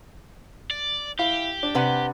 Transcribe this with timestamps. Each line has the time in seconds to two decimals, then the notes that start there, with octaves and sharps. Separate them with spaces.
0.71 D5
1.19 E4 G4 F5
1.63 D4
1.75 C3 B4 F#5